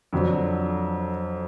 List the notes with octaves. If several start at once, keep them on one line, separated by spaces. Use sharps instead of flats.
F2 D3 F#3